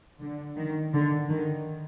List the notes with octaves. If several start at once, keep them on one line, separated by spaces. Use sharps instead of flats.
D3
D#3
D3
D#3